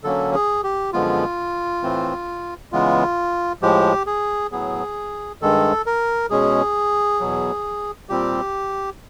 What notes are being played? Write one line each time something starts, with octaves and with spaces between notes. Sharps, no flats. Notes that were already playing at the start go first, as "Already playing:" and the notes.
D3 F#3 A#3 C#4 A4
G#4
G4
F#2 D3 F3 G#3 B3 F4
A2 E3 A3 C4
C#3 E3 G#3 B3 F4
A2 F3 G#3 G4
G#4
A2 F#3 B3 G#4
G2 D#3 G#3 A4
A#4
B2 G#3 C#4 G#4
E2 B2 F#3
A#2 G3 C4 G4